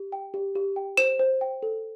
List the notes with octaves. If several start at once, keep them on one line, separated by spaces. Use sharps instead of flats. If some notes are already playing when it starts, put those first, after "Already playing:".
Already playing: G4
G5
G4
G4
G5
C5 E7
C5
G5
A4